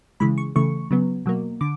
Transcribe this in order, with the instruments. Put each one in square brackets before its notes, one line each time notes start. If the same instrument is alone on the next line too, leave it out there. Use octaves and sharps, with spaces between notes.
[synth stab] C#3 E3 G#3 B5
C#6
C#3 E3 A3 C#6
C#3 F#3 B3
B2 F#3 A#3
D3 D6